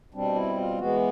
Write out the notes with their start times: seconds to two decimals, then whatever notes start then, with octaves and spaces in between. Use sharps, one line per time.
0.14 B2 G3 C4 D4
0.35 E4
0.57 F4
0.78 E3 G#3 B3 F#4